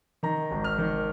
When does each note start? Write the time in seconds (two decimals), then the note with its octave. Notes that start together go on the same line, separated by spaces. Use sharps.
0.23 D#3 A#5
0.51 G#1
0.64 F6
0.78 D#3